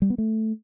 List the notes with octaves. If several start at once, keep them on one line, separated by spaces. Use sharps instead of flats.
G3
B3
A3